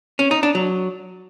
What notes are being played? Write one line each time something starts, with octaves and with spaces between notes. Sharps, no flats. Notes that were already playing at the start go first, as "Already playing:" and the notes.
C#4
D#4
D4
F#3